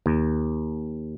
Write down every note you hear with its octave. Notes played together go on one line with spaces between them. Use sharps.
D#2